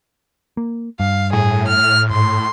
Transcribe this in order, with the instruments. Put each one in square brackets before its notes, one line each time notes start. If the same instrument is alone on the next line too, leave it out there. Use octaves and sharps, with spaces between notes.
[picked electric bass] A#3
[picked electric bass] G2 [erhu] F5
[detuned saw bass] A2 [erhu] G#4
[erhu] F6
[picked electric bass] G#2 [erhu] C6